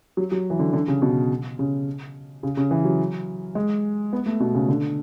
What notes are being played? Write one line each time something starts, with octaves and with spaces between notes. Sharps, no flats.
F#3
F#3
E3
D3
D3
C#3
B2
C#3
C#3
C#3
E3
F#3
G#3
B3
A3
B2
C#3
D3